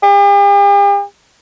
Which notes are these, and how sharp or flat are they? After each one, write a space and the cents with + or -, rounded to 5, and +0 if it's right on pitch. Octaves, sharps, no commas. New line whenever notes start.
G4 +45